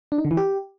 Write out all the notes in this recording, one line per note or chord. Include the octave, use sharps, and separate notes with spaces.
D4
D#4
D3
E3
G4